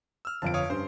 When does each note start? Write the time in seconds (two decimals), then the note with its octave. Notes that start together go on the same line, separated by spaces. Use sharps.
0.25 E6 F6
0.42 G1 F2 A5 D7
0.54 C#5 F5 D#6
0.70 G2 C#4 C5 C6